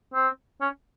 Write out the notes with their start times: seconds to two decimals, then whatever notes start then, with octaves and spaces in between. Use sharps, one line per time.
0.14 C4
0.61 C#4